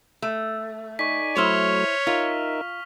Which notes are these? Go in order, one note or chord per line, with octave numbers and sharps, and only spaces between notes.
A3
D#4 D5 G#5 C#6 B6
F#3 A3 E4 C5 C#5 F6 F7
D#4 F4 A#4 E5